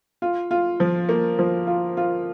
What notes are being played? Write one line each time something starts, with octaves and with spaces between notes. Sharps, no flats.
F4
F4
F3
A#3
F3
F4
F4